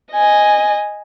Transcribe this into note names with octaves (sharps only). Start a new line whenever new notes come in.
D#5 G#5